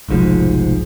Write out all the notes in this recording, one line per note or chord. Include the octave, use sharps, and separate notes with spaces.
F1 B1 G#2 F3